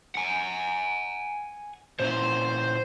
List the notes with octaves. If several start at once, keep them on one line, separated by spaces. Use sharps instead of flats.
F#5 G#5
A#2 C#4 E4 C5 C6